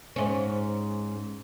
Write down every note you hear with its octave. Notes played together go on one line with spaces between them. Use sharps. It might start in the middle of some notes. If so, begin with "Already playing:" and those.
G#2 C#4